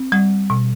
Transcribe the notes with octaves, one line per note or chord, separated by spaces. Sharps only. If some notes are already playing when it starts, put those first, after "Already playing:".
Already playing: C4
G3
B2